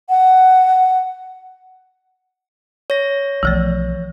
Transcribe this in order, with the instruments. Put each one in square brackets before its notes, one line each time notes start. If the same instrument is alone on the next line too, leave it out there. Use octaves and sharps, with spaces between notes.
[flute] F#5
[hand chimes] C#5 A#6
[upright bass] B1 D3 [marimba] E3 F3 A3